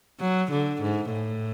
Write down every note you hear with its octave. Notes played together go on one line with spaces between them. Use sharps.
F#3
D3
G#2
A2